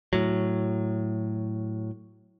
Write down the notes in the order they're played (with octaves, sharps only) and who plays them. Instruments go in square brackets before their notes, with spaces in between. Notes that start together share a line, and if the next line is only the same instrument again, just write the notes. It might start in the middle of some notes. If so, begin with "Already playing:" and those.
[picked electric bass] A2 F#3